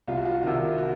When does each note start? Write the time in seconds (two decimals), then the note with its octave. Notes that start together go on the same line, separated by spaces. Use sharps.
0.07 C2 F4
0.17 F#4
0.25 F4
0.35 F#4
0.43 C3 D#3 F4
0.78 F#4